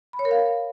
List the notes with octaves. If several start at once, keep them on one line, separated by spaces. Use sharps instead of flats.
B5
C#5
A#4
F5